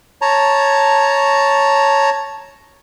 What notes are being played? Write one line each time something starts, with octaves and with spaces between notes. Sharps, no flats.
C#5 A5 A#5